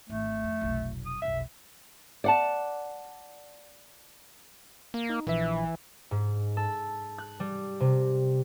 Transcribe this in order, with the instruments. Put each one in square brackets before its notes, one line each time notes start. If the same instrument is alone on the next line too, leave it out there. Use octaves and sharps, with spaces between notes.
[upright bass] G#1 [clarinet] A3
[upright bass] F2
F1 B1
[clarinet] D#6
[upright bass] F1 B1 [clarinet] E5
[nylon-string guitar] D5 F#5 A5
[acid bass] A#3
[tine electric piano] D#4
[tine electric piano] A#1 B4 E5 [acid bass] E3
[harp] G#2
A4
F#6
G3
C3